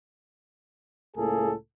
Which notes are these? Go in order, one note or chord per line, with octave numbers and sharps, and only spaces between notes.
C#2 A2 A#3 G#4 A4